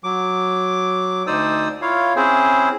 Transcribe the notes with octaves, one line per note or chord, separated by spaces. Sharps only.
F#3 D6
D2 D#4 C5 D5 D#6 E6
E4 F4 C#5 F5
C4 C#4 E4 G#4 C5